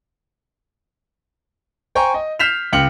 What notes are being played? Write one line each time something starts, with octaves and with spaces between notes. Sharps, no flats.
C5 G5 G#5 A#5 C#6
D#5
F6 G6 B6 C7 E7 F7
C#2 G5 F6 C#7 F#7